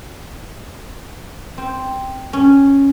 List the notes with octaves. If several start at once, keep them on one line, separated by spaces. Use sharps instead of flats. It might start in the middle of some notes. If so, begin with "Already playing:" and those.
C4
C#4